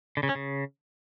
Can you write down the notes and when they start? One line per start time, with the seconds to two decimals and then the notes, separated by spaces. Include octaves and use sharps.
0.17 D3
0.23 C#3
0.29 C#4
0.35 C#3